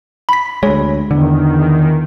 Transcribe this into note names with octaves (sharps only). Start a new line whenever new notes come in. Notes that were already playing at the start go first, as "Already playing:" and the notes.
B5 B6
D2 G#3 C#5
E2 D3 D#3